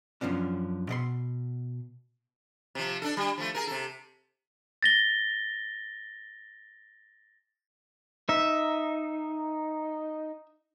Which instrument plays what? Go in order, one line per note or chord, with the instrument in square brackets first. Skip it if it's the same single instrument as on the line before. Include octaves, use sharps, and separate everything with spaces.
[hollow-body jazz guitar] F#2 A#2 F3 C#4 D4
B2 D5 C6
[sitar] C3 F3
D4 A4
G3
F3 A3
G#4 A#4
C3 A4
[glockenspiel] A6 A#6 G7
[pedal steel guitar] D#4 [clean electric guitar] E5